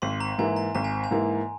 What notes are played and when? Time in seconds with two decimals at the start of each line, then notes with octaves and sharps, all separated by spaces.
0.02 G#1 C6
0.20 A#5
0.38 G#2 E3 A#3 E4 G#5
0.56 A#5
0.75 G#1 A#5
0.84 G#5
1.04 G#5
1.11 G#2 E3 A#3 E4